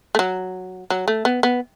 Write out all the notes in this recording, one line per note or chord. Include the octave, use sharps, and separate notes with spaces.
A3
F#3
F#3
A3
B3
B3